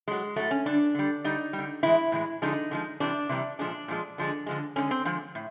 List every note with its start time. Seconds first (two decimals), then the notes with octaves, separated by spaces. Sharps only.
0.08 A2 F#3 G#3
0.36 A2 F#3 A3
0.51 C#4
0.66 D3 G3 D4
0.94 D3 G3
1.24 D3 G3 D#4
1.53 G3
1.58 D3
1.83 A2 E3 G#3 E4
2.12 A2 E3 G#3
2.42 D3 F3 G#3 D#4
2.71 D3 F3 G#3
3.00 C3 E3 G3 D4
3.29 C3 E3 G3
3.59 A#2 F3 G#3 D4
3.88 A#2 F3 G#3
4.18 D3 F3 G#3
4.46 D3 F3 G#3
4.76 D3 F3 G#3 C#4
4.91 C4
5.05 D3 F3 G#3 C4
5.35 A2